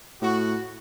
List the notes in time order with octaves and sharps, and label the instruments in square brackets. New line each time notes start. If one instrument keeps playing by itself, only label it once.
[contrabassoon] A2 [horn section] F#4